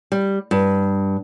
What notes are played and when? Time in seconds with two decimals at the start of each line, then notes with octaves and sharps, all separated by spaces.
0.12 G3
0.51 G2